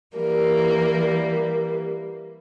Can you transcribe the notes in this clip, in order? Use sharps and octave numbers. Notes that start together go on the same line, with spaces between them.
E3 G3 A#3 A#4